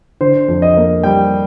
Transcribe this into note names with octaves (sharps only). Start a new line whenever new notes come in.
D3 C5
F2
D#5
A#3
G3 G5